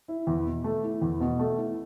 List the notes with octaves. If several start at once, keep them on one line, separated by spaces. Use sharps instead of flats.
E4
E2
B2
A3
E4
E2
B2
A3
E4